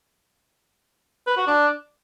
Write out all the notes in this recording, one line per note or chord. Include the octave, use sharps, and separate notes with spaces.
B4
F#4
D4